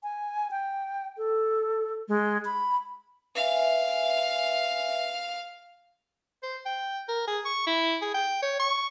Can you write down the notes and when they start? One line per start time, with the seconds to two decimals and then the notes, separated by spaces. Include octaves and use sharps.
0.03 G#5
0.51 G5
1.17 A4
2.08 G#3
2.45 B5
3.35 B4 E5 F5 G#5
6.43 C5
6.66 G5
7.09 A#4
7.28 G#4
7.45 C#6
7.67 E4
8.02 G#4
8.14 G5
8.42 C#5
8.59 C#6